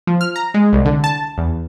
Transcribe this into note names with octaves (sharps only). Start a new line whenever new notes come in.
F3
F6
A#5
G#3
C2
D3
A5
E2